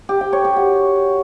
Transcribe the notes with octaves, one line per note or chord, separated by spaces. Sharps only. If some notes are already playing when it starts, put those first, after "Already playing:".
G4
G5
C#5
G4
F#4